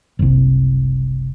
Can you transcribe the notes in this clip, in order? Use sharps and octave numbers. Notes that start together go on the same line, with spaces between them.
F#1 C2